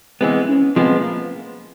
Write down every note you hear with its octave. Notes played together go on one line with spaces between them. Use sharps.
E3 G#3 B3 C4
C#4
F3 G#3 B3 C4
A3
A#3